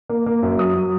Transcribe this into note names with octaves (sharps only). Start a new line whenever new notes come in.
A#3
A#3
F#2
F#3 D#6
F#3